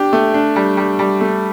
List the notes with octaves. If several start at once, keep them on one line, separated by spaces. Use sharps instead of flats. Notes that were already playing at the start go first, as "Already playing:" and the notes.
Already playing: D4 G4
A3
D4
G3
G3
G3
A3